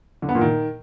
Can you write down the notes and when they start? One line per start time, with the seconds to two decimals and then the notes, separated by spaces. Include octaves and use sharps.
0.22 D3
0.29 B3
0.35 A#2
0.41 D#3